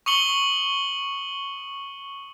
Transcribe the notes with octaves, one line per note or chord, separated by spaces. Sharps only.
C#6 D#6 C#7 F#7 G7